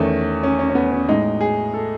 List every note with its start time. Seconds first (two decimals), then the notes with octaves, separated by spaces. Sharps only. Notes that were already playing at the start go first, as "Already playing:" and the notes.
Already playing: E2 D#3 A3 C#4
0.43 C#4
0.59 C#4
0.70 C#4
0.75 B3
0.92 C#4
1.08 A2 G#3 D#4
1.41 G#4
1.74 A4